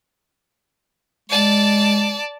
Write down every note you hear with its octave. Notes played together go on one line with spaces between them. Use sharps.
G#3 D5 A5